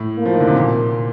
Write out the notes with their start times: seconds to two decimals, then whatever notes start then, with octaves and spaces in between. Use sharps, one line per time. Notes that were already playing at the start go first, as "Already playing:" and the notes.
Already playing: A2
0.18 A#3
0.26 F3
0.34 D#3
0.40 D3
0.47 C3
0.55 A#2